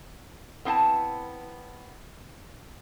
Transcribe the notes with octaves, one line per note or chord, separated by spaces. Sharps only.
B3 C4 E4 G5 A5